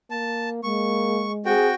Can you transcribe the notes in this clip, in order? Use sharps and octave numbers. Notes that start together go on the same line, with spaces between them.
A#3 A5
G#3 A#3 C#6
C4 F#4 G#4 G5